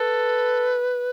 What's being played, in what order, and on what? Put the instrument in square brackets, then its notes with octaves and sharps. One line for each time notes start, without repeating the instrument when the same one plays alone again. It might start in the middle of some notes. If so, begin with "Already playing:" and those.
Already playing: [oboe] A4 [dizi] B4